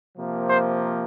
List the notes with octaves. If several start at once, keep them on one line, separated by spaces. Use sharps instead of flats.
C3 F3 A#3
C5